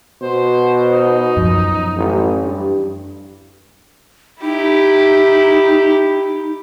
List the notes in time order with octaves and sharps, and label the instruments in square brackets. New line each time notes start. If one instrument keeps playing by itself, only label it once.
[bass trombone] B2 [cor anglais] C5
[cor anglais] D#4
[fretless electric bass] F#2 F3
[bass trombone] A1
G2
[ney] D#4 [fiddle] E4 G4